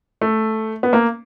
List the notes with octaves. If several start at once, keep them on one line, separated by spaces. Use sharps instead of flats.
A3
B3
A#3